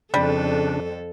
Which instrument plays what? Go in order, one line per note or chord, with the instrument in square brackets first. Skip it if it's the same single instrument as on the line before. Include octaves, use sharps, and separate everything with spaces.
[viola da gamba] F2 A4 [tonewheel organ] C#3 D4 [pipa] G3